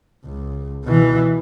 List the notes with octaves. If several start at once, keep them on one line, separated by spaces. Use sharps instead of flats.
C#2
B2 E3